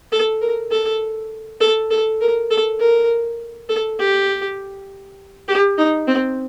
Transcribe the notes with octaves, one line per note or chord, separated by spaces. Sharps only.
A4
A#4
A4
A4
A4
A#4
A4
A#4
A4
G4
G4
D#4
C4